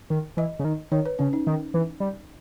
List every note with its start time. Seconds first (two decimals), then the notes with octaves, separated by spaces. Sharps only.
0.10 D#3
0.37 E3 D#5
0.59 C#3
0.65 D#3
0.92 D#3 C#5
1.06 B4
1.19 C#3 C#4
1.33 D#4
1.47 D#3
1.74 E3
2.00 G3